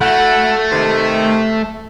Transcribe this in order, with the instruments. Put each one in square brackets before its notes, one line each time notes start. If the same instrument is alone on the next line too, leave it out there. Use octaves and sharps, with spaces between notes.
[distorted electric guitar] A3 [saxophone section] E4 F#4 F#5
[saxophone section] C3 D#3